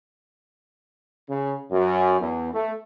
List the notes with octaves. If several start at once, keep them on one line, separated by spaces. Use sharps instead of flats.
C#3
F#2
E2
A3